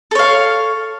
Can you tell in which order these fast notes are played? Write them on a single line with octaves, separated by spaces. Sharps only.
A4 C#5 F5